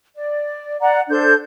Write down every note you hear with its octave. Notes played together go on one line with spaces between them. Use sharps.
D5
D5 F#5 A#5
D4 A4 C5 G6